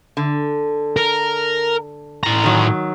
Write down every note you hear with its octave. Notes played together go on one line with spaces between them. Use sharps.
D3
A#4
A2 A#5
D#3 F#3